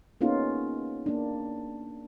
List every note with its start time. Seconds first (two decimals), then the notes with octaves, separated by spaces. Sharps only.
0.21 A#3 B3 C#4 D#4 F4 G#4
1.06 A#3 D4